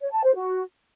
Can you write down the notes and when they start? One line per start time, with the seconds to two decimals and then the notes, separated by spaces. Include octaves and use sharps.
0.01 C#5
0.12 A5
0.24 C5
0.35 F#4